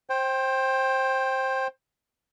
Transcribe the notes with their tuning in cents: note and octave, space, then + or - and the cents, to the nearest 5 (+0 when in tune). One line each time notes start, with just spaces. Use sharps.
C5 +20 G5 +0